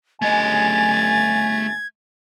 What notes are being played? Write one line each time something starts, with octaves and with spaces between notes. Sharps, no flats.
G1 C#3 A3 D#5 G#5 G#6 A6